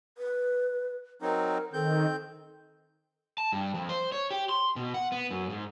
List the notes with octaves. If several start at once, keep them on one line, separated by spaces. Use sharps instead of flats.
B4
F#3 C4 D#4 A#4
D#3 C4 A4 G6
A5
G2
F2
C5
C#5
G4
C6
B2
F#5
B3
F#2
G#2